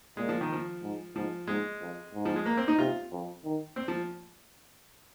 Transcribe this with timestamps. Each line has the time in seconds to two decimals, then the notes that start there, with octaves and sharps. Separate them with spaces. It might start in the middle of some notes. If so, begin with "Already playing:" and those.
0.17 A#2 G#3
0.29 F3
0.41 D#3
0.52 F3
0.82 G#2
1.15 G#2 F3
1.47 G#2 G#3
1.81 F2
2.14 G#2
2.25 F3
2.36 G#3
2.46 A#3
2.57 C4
2.68 D#4
2.79 C3 F4
3.12 F2
3.44 D#3
3.76 C4
3.88 F3